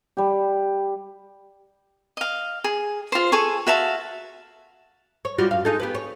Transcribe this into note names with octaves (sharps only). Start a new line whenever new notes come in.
G3 G4
D#5 F5
G#4
F4 C5
G#4 A4 G#5 C#6
F#4 E5 F5 A5
C#5
G3 F4 F#4
F#2 F5
G#3 D#4 A4
B3 G4 B4
C#5